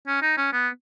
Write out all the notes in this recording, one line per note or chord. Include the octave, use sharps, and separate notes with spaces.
C#4
D#4
C#4
B3